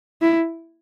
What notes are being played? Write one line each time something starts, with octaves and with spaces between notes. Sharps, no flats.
E4